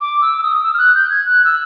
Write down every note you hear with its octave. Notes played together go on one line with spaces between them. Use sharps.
D6
E6
E6
D#6
E6
F6
F#6
G6
G#6
F#6
E6